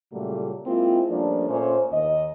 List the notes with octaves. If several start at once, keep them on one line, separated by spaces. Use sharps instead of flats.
A#2 C#3 F#3 G3 A3
G#3 A#3 C4 E4 F4
F3 G3 A3 A#3 C#4 D4
A#2 A3 C#4 C5
D#2 D#5